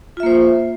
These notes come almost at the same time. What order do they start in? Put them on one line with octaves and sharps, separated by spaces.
F4 E5 A#3 C5